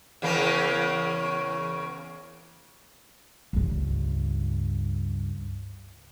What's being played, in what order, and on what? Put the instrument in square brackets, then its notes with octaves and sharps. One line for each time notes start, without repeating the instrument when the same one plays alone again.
[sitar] E2 C#3 A#3
[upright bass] C#2 G2